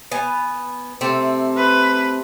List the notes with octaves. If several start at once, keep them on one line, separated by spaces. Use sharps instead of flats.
B3 G#5
C3 A3 C4
B4